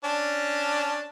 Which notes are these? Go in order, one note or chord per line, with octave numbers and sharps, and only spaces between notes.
C#4 D4